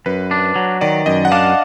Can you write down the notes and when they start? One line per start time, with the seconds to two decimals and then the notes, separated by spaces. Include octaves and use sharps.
0.06 F#2 B4
0.31 D4
0.56 F#3
0.81 D#3 D5
1.06 F#2 D#5
1.25 F#5
1.32 D4 F5